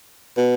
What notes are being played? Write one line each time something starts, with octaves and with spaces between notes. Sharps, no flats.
B2